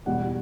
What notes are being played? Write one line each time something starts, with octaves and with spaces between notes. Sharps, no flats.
E2 B2 G3 F#5